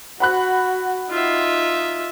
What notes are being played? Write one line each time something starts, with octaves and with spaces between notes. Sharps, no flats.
F#4 F#5 B5 F#6
D#4 F4 E5